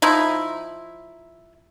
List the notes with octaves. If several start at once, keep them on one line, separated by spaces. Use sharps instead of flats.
F3 D#4 E4